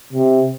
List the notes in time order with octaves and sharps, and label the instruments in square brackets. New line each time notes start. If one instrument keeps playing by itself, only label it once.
[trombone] C3